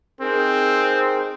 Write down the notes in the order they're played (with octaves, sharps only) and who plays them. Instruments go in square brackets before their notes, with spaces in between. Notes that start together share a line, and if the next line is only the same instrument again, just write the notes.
[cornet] C4 [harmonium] D#4 G#4 A#4